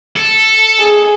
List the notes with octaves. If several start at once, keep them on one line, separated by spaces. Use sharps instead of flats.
A4
G#4